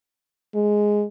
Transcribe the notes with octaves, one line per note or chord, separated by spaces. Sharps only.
G#3